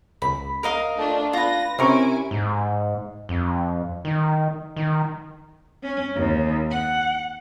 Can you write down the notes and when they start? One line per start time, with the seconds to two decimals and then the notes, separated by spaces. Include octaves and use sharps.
0.22 C#2 B5
0.63 A#4 D#5 F5
0.96 A3 D4 F4
1.33 F4 B4 A#6
1.78 C3 C#4 E4 A#4 G#5 C6 C#6 D7
2.31 G#2
3.29 F2
4.05 D#3
4.76 D#3
5.83 C#4
6.15 D#2
6.71 F#5